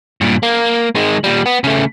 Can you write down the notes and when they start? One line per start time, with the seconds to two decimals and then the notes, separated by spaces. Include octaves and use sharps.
0.21 G2 A#2
0.43 A#3
0.95 D#3 G#3
1.24 A#2 G3
1.46 B3
1.64 C#3 A3